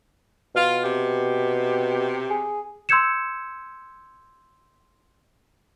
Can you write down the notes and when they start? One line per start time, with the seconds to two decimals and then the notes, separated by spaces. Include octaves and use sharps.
0.55 B2 F4
0.82 C3 G4
2.31 G#4
2.89 C6 E6 G6 G#6 C#7 E7